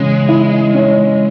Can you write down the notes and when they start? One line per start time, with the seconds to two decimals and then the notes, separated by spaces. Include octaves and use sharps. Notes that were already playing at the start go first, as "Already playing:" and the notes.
Already playing: C#3 E3 G#3
0.29 E4
0.74 C#4